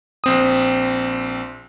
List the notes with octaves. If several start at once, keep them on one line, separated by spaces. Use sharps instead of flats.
A#1 C4 D#6